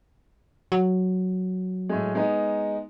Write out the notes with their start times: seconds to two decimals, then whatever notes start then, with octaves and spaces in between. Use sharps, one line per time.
0.72 F#3
1.89 A2 G#3
2.15 G#3 B3 D#4